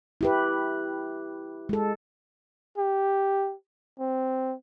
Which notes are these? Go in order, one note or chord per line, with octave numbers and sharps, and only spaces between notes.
E4 G4 B4
G#3 A4
G4
C4